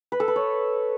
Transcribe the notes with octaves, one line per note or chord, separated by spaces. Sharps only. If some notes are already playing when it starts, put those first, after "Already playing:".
B4
A4
B4
C#5